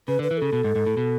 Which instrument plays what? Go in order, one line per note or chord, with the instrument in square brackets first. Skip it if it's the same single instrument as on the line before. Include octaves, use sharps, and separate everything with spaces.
[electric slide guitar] C#3 [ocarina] B4
[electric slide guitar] D3
[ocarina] B4
[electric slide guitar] E3
[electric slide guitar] C#3 [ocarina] A4
[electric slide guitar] B2
G#2
G#2
A2
B2